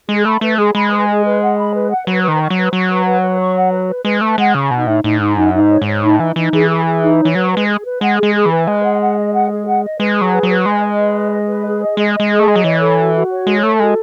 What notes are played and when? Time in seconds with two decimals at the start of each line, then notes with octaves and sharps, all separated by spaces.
0.08 G#3 G#4
0.25 A3 B5
0.41 A3 B4
0.58 G#3 G#4
0.74 G#3 B5
0.91 B4
1.07 G#4
1.24 B4
1.41 F#5
1.57 B5
1.74 B4
1.90 F#5
2.06 F#3 B4
2.23 D#3 B4
2.40 C#6
2.50 F#3
2.56 B4
2.72 F#3 C#6
2.90 B4
3.06 B4
3.22 B4
3.39 C#6
3.55 F#5
3.72 B4
3.88 B4
4.05 G#3 B4
4.21 A3 B4
4.38 G#3 F#5
4.54 C#3 C#6
4.71 B2 D#4
4.87 A2 D#4
5.03 A2 D#4
5.20 G#2 D#4
5.37 F#2 D#4
5.54 D#4
5.59 G#2
5.70 C#5
5.82 G#2
5.87 C#5
6.03 A2 D#4
6.20 E3 D#4
6.36 E3 D#4
6.52 E3 G#4
6.69 G#4
6.85 G#4
7.02 D#4
7.19 C#5
7.25 E3
7.35 F#3 B4
7.52 B4
7.57 G#3
7.68 G#4
7.85 B4
8.01 G#3 F#5
8.18 G#3 G#4
8.35 G#4
8.46 E3
8.51 B4
8.67 G#3 B4
8.83 F#5
9.00 F#5
9.17 D#5
9.34 F#5
9.50 G#4
9.66 F#5
9.83 D#5
9.99 G#3 B4
10.16 G#4
10.21 F#3
10.33 B4
10.43 F#3
10.49 B4
10.66 G#3 D#5
10.82 D#5
10.99 B4
11.15 D#5
11.32 D#5
11.48 B4
11.65 G#4
11.81 D#5
11.97 G#3 D#5
12.14 D#5
12.20 G#3
12.31 G#4
12.39 A3
12.47 G#3 D#5
12.56 F#3
12.64 E3 C#5
12.80 A4
12.97 F#4
13.14 F#4
13.30 C#5
13.47 G#3 A4
13.63 A3 A4
13.79 G#3 F#4